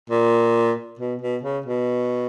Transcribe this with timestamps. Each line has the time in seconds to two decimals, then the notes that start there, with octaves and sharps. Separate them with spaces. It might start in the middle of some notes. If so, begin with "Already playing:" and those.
0.10 A#2
0.99 B2
1.22 B2
1.43 C#3
1.66 B2